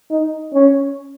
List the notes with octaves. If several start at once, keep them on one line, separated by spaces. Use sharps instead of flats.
D#4
C#4